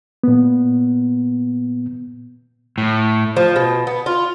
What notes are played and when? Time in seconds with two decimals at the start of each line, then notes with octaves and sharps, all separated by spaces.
0.23 A#2 B3
2.78 A2
3.37 F3
3.56 B2
3.87 B3
4.06 F4